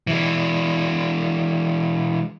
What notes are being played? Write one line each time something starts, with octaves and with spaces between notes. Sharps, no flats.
E3 G#3